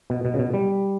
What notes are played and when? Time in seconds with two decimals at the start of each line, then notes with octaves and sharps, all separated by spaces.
0.10 B2
0.25 B2
0.34 C#3
0.39 B2
0.54 G3